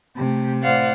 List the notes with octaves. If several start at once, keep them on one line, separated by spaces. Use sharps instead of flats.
C3 A3 G4
A2 C5 D5 F5 F#5